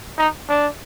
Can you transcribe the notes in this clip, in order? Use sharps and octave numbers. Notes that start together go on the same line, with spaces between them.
D#4
D4